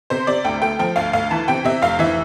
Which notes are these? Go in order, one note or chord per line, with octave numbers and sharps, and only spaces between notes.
C3 C5
C3 D5
D2 G5
A3 G5
F3 G5
D2 F5
D2 F5
E3 A5
C3 G5
C3 E5
F1 F5
E3 E5